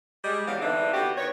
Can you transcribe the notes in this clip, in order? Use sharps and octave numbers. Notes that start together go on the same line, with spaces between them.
G3 G#3
E3 F#3 G3 B3 F5
D3 E3 C4 D4 D#4
B3 F#4 G4
D#3 B3 C#5